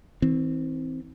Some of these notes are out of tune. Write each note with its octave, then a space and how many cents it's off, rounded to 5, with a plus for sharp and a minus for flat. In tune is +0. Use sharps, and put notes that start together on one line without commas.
E3 -45 C4 +0